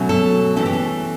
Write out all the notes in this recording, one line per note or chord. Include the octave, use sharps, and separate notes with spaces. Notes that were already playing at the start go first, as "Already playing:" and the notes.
Already playing: B2 F#3 A3 C#4
A4
E3 A3 C#4 A4
G4
A4